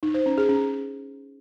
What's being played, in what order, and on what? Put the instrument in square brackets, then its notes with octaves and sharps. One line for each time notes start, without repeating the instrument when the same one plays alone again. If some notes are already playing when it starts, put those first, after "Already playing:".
[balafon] D#4
C5
C#4
G#4
C#4